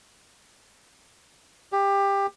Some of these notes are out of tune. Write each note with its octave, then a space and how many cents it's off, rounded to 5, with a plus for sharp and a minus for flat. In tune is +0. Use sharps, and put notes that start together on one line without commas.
G4 +20